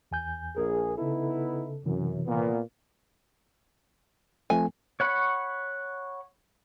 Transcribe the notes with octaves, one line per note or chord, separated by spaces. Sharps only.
E2 G#5 G6
A#1 G#4 A#4
C#3 B3 D#4 E4 A4
F#2 C3 E3
A#2 B3
F3 A3 C4 G#5
C#5 F#5 B5 C#6